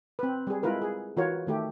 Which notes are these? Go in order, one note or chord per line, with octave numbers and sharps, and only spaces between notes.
C4 B4
G3 G#4
G#3 E4 F4 A#4 B4
G#4
E3 F4 F#4 A#4 C#5
D#3 A3 G4